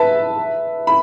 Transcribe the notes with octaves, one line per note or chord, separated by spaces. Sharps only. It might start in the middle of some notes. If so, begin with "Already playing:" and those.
Already playing: B4 E5 A5
B5